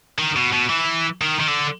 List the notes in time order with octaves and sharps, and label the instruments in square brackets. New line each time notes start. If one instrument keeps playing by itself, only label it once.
[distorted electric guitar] D#3
B2
B2
E3
D#3
D#3
D3